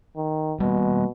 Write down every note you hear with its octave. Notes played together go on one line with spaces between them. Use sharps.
D#3
B2 G3 G#3 A#3